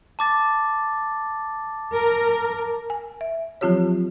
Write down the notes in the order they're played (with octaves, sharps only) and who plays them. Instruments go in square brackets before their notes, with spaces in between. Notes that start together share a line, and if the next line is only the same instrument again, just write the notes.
[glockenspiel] A5 D6 A6
[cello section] A#4
[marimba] G#5
E5
F3 F#3 C4 F4 G4 C#5